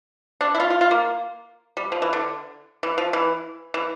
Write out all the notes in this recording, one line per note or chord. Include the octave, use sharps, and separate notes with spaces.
D4
E4
F4
F4
F4
A#3
G3
F3
E3
D3
E3
F3
E3
E3